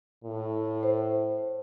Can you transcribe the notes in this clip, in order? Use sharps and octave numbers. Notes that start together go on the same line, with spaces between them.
A2
C5